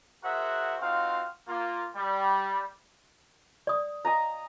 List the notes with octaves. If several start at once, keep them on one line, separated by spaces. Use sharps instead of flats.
F#4 G#4 A#4 C5 E5 F#5
C4 D#4 F4 F#4 F5
A#3 F4
G3
D5 D#6
D#5 G#5 A#5